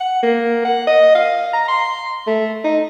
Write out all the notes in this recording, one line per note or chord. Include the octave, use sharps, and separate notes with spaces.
F#5
A#3
F#5
D#5
F5
A#5
C6
A3
D#4